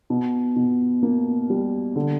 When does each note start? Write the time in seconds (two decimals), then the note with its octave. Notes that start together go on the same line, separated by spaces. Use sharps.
0.10 B2
0.56 B2
1.03 A#3
1.50 G3
1.96 D3